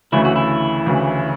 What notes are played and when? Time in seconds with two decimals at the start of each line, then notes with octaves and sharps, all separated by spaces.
0.12 D2 C#3 E3 A3 E4
0.25 F#4
0.36 E4
0.86 D2 C#3 E3 A3